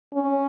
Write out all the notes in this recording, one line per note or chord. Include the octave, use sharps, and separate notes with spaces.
C#4